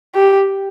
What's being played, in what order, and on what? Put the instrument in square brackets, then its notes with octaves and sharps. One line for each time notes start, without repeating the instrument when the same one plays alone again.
[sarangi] G4